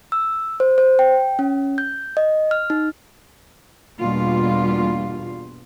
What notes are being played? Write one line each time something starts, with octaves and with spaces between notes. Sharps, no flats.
E6
C5
C5
G5
C#4
G6
D#5
F6
D#4
E2 G2 B2 A#3 F4